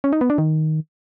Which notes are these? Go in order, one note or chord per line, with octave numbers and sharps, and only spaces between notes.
C#4
D#4
B3
D4
D#3